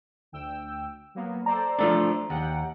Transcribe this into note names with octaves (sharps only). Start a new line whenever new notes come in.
D2 G5 E6
F#3 A#3 B3
A4 C5 D5 A#5
F3 A3 D4
D#2 F#5 G5